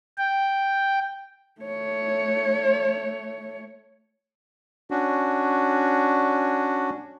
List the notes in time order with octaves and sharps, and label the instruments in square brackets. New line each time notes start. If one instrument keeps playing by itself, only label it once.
[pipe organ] G5
[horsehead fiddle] A3 C#5
[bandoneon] C#4 D4 F#4